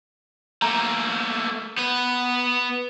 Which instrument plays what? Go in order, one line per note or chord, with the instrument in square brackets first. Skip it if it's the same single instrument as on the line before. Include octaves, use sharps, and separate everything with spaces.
[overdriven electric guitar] A3 A#3 [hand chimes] A#5
[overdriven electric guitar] B3 B4